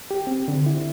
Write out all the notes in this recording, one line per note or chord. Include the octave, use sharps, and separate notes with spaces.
G4
C4
D3
E4